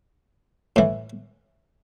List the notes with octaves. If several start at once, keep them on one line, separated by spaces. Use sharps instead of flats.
A2 E3